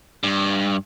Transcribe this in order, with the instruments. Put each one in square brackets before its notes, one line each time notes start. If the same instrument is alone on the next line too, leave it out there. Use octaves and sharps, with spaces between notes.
[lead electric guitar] G2